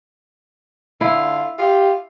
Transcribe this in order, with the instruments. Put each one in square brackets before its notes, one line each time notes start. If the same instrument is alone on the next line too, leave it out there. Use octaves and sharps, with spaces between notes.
[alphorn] D3 [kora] E4 [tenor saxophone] F4
[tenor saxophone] F4 [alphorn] G4